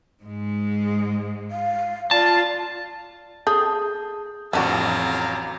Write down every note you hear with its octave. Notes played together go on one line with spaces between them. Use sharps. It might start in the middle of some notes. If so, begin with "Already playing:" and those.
G#2 G#3
F5
F4 D5 A5
G#4 A4 G6
A1 F2 F#3 G3 D4 F#4 F5 A#5